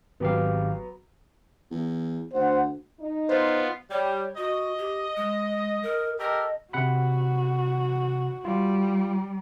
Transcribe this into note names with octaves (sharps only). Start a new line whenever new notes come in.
G#1 F#3 B3 G4 F5
E2
D2 C5 F#5
D#4
B3 F4 C5
G3 C#5
F#4 D#5
G4
G#3
A#4
G4 A4 A#4 D#5
C3 F#4 F#5 B5
G3 F4